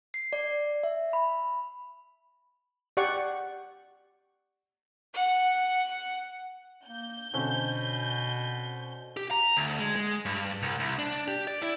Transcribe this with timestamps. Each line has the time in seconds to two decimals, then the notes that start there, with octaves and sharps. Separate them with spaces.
0.14 C7
0.33 D5
0.83 E5
1.13 B5
2.97 G4 D5 F#5 C#6
5.14 F#5
6.87 A#3 G6
7.34 B2 D3 C4 C#4
9.17 G4
9.31 A#5
9.57 D2
9.79 G#3
9.96 G#3
10.25 G2
10.62 C2
10.79 C2
10.99 D4
11.28 G4
11.47 D5
11.62 E4